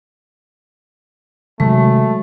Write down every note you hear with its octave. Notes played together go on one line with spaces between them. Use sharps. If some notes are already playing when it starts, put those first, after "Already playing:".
C3 D#3 F#3 G#3 A3